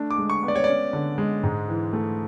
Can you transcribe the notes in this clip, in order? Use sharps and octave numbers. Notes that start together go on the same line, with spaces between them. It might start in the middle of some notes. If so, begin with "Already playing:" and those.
Already playing: A3 D4
D6
G#3
C#6
B3
D5
C#5
C#4 D5
D3
G#3
G#2
E3
A3